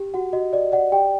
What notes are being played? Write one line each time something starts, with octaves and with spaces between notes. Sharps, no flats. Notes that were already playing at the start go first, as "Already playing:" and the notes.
Already playing: G4
F#4 F#5
F#4 D#5
D5 D#5
D5 F#5
G4 G5